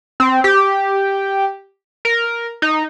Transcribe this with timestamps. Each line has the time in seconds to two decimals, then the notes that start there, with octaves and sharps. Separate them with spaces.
0.20 C4
0.44 G4
2.05 A#4
2.62 D#4